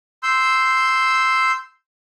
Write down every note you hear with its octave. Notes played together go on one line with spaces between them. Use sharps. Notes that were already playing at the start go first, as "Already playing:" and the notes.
C6 E6 G6